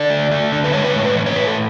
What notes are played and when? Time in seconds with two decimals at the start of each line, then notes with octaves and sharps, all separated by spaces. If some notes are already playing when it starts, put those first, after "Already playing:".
Already playing: D3 D5
0.10 A3
0.31 A3
0.52 D3
0.64 B4
0.73 G#3 C#5
0.84 B4
0.94 A2 C#5
1.05 B4
1.15 E3 C#5
1.26 C#5
1.36 A2 B4
1.47 A4